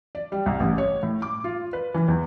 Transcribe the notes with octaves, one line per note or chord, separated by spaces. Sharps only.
D5
G3
C2
A1
C#5
A2
D6
F4
B4
E3
E2